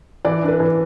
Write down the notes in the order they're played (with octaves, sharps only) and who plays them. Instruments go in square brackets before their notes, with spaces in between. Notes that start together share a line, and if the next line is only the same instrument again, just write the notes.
[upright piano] E3 [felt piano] D5
[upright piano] D4
[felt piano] B4
[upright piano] E3